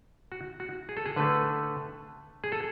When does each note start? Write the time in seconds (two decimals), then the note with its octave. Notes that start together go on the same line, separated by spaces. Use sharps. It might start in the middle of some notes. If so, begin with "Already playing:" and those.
0.32 F#4
0.60 F#4
0.89 G#4
0.97 A4
1.06 G#4
1.16 D3 A3 B4
2.44 G#4
2.52 A4